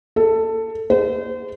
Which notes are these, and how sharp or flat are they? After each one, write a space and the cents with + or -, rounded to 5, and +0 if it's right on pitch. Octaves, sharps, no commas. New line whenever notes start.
A4 +15
C5 -35